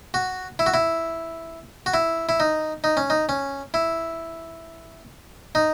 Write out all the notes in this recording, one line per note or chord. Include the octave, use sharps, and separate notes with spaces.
F#4
E4
F#4
E4
F#4
E4
E4
D#4
D#4
C#4
D#4
C#4
E4
D#4